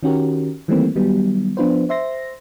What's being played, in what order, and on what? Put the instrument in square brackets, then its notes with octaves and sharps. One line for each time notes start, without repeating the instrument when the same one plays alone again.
[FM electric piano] D#3 C#4 F#4 G4 A#4
D#3 E3 G3 A3 A#3 C4
D#3 F#3 G3 B3
F3 B3 D4 F4 B4 C5
C5 E5 C6 A#6